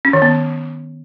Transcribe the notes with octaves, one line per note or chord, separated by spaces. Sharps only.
C#4
D#3
B3